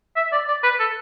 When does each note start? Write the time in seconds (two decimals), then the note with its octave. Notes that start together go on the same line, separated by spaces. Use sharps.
0.16 E5
0.32 D5
0.48 D5
0.63 B4
0.79 A4